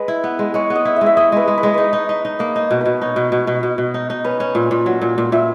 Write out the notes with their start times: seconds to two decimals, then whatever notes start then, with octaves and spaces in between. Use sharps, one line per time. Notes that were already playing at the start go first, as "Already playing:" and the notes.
Already playing: G#3 B4
0.08 E4
0.24 B3
0.39 G#3
0.54 G#3 C#5
0.70 B3
0.75 D#5
0.85 E4
0.96 E5
1.01 G#3
1.06 E5
1.17 E4 D#5
1.32 G#3 B4
1.48 G#3
1.58 B4
1.63 G#3 C#5
1.74 D#4 B4
1.93 D#4
2.09 D#4
2.25 D#4
2.39 A#3 D#5
2.56 D#4 C#5
2.71 B2
2.81 B2 B4
3.01 D#4 C#5
3.16 B2
3.32 B2
3.47 B2
3.63 B2
3.78 B2
3.94 D#4
4.10 D#4
4.24 C#4 B4
4.40 C#4
4.55 A#2
4.71 A#2
4.86 F#3
5.01 A#2
5.18 A#2
5.32 A#2 E5